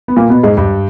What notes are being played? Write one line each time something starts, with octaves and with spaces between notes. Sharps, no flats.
B3
A#2 A#3
B2 B3
G#2 G#3
G2 G3